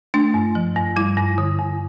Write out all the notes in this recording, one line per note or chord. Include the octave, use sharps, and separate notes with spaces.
A3 D4
G2
F3
G2
G3 E4
G2
D3
G2